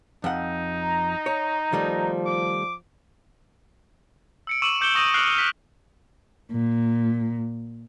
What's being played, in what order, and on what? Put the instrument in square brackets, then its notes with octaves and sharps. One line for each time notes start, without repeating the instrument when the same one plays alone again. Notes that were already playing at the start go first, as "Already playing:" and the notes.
[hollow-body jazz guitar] F2 F#5 [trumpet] D#4
[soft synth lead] A#5
[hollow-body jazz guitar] C#5
[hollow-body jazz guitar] D#3 G3 A3 [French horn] F3
[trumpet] D6
[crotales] E6 C#7 D7
C#6 D6 E6 D#7 E7 F#7
D6 G6 C#7 E7 G7
C#6 D#6 A#6 D7 D#7
F6 F#6 C7 D7 F7 F#7
F6 B6
[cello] A#2